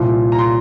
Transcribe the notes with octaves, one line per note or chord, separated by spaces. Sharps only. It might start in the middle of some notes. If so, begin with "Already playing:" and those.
Already playing: C2 A#2 F3
A#5
C6